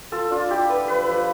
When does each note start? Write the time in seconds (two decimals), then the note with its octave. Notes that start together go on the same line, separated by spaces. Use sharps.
0.12 F4 A4
0.31 D4 F4
0.50 E4 G4
0.69 B3 B4
0.88 F3 B4
1.07 F3